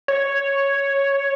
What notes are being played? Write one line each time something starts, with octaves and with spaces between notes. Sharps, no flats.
C#5